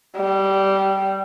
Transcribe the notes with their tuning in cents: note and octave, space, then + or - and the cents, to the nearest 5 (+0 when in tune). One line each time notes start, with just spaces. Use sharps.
G3 -15